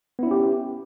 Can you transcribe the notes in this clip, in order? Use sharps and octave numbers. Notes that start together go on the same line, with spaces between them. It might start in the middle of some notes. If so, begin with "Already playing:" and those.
B3 C#4 E4 G4